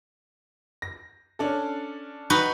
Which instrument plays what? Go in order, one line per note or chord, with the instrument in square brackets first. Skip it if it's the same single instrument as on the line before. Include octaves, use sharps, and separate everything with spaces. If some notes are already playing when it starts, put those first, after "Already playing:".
[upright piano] A#6
C#4 D4 A4
[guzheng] D#4 F#4 B4